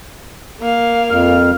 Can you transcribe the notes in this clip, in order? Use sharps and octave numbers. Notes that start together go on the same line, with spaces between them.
A#3 F5
F2 F6